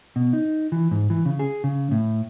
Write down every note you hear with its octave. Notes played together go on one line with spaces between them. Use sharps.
B2
D#4
E3
G#2
E3
C#3
G#4
C#3
A2